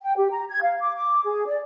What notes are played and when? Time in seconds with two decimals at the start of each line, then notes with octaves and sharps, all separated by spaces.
0.02 G5
0.17 G4
0.31 A#5
0.50 G#6
0.62 F5
0.81 D6
0.95 D6
1.26 G#4
1.47 D5